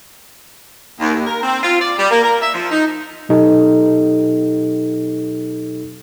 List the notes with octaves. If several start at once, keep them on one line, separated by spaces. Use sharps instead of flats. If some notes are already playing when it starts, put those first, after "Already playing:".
D#2
D#2
A#4
C4
F4
D5
G3
A#3
A#4
E5
F3
D#4
B2 F#3 D#4 G4 A4